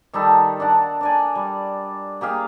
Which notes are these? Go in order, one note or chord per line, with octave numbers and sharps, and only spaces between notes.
D#3 G3 D#4 A4
D4 D5 F#5
D4 D5 G#5
G3
A#3 G4 G#4 F5